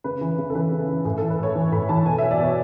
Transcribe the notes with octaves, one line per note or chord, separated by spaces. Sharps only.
C#3 B4
E3
C#3
A4
E3 B4
C#3
E3
A2 G#4
E3 A4
B4
A2 C#5
E3
A2 B5
E3 A5
B2 G#5
F#3 E5
D5
B2 C#5